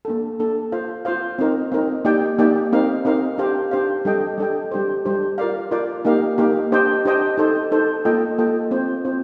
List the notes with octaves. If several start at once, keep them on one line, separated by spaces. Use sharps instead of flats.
A#3 D4 A4
A#3 D4 A4
F4 C5 F5
F4 C5 F5
C4 D#4 A#4
C4 D#4 A#4
A#3 D#4 G4 D5 G5
A#3 D#4 G4 D5 G5
C4 D#4 A#4 F5
C4 D#4 A#4 F5
D4 G4 C5 F5
D4 G4 C5 F5
G3 D4 A4 D#5 G5
G3 D4 A4 D#5 G5
G3 D4 G4 C5
G3 D4 G4 C5
F4 A#4 D5 F5
F4 A#4 D5 F5
A#3 D#4 G4 A#4 F5
A#3 D#4 G4 A#4 F5
D4 G4 C5 D#5 G5
D4 G4 C5 D#5 G5
D#4 A4 C5
D#4 A4 C5
A#3 F4 A4 D#5 G5
A#3 F4 A4 D#5 G5
C4 F4 C5
C4 F4 C5